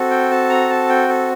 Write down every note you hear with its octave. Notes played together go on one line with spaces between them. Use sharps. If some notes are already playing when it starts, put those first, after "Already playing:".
Already playing: C4 F#4 A4
G5
A5
A#5
A5
G5
A4